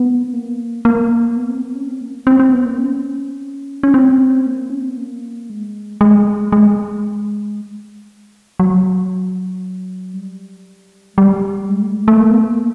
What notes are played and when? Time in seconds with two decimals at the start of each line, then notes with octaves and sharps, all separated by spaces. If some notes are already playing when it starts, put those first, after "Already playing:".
Already playing: B3
0.33 A#3
0.85 A#3
1.37 B3
1.49 C4
1.63 B3
1.71 C4
1.75 C#4
1.88 C4
2.01 A#3
2.27 C4
2.40 C4
2.52 B3
2.66 A#3
2.78 C#4
3.83 C#4
3.94 C4
4.46 A#3
4.70 C#4
4.79 C4
4.89 B3
4.98 A#3
5.50 G#3
6.01 G#3
6.52 G#3
8.60 F#3
10.14 G3
11.18 G3
11.69 G#3
11.82 A3
11.95 G#3
12.08 A3
12.21 A#3
12.31 B3
12.42 A#3